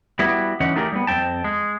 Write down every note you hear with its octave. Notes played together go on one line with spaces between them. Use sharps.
G3 B3 E4 F#4
D3 E3 C#4 D#4 F#5
A3 D#4 G4 G#4 A#4
G3 B3
F2 G#2 C4 G5 A5
G#3